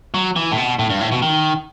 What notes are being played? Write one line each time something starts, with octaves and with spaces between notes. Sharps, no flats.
F#3
E3
A2
B2
A2
G2
A2
B2
D#3